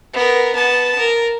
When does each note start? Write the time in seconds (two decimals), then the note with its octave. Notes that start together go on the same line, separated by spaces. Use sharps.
0.13 B3 A#4
0.55 B3 A5
0.99 A#4